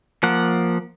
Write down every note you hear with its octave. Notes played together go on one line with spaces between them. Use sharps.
F3 A#3 F#5